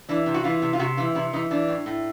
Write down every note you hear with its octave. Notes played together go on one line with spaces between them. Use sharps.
E3 D4
C3
F#4
E3 F4
C3
F4
C3 F#4
E3 F4
C3 E4
E3 D#4
E3 D4
A2
A2